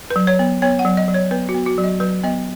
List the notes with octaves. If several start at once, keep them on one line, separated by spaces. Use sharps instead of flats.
B4
F#3
C#5
B3
B3 C#5
F#5
F#3
D#5
F#3
C#5
B3 B4
F#4
B3
F#4
F#3
D#5
F#3 B4
B3 D#5